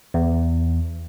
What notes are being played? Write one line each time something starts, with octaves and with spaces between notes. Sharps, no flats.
E2